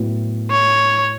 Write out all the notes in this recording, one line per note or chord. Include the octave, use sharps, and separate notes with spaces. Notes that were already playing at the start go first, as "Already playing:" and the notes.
Already playing: A2 F#3 B3
C#5